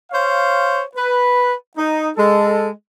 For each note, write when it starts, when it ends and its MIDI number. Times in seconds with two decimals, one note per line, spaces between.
0.11 0.80 72
0.11 0.80 73
0.11 0.80 77
0.95 1.52 71
1.77 2.07 63
2.17 2.68 56
2.17 2.68 69